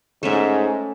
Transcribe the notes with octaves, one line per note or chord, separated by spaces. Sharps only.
G#2 A3 C#4 E5